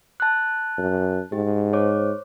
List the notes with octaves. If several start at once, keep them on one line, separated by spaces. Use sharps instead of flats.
A5 F#6
F#2
G#2 G4
C5 C#5 D6